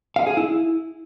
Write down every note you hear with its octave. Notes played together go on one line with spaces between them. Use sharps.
F5
G#4
E4